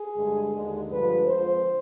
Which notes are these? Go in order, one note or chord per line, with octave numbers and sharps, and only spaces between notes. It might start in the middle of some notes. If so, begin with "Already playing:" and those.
Already playing: G#4
G2 D3 G#3
D#2 D3 G#3
G2 D3 F3 G#3 B4
F2 D3 F3 G#3 C5